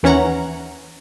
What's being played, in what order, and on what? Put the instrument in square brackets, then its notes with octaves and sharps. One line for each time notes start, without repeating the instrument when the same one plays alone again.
[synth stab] D#2 E3 C#4 C#5 F#5 A#5